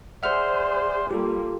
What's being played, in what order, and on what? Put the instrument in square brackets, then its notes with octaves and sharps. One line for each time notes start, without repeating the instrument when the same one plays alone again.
[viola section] G#4 C5 [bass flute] D5 [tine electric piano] E5 F#5 F6
[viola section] G3 A#3 [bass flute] F4 [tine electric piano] G4 A4